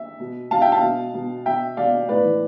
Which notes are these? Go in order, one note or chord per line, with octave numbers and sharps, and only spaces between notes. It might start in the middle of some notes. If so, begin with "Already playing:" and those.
Already playing: E5
B2
B2 F5 A5
E5 G5
F5 A5
B2
B2
B2 E5 G5
B2 D5 F5
A2 B4 D5
E3